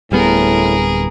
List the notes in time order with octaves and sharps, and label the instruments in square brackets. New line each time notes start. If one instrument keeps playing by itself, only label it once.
[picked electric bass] D1 G3 B3 [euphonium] A2 [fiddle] G#4 A#4